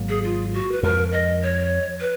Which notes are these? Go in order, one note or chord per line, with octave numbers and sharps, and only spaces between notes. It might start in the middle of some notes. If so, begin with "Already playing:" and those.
Already playing: G#1 G#2 F#3 A#3
G#4
F4
F#4
B4
F2 F3 G#3 A#4
D#5
C#5
B4